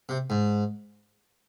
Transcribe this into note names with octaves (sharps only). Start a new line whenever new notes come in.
C3
G#2